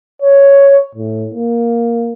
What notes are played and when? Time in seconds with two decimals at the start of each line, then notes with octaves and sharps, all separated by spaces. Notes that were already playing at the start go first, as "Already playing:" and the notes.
0.22 C#5
0.95 A2
1.34 A#3